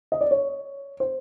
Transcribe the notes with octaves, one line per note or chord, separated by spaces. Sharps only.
D#5
D5
C#5
C5